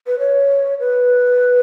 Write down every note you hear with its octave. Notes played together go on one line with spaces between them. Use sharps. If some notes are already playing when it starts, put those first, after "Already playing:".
B4
C#5
B4